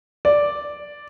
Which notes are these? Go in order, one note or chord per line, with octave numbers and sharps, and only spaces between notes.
D5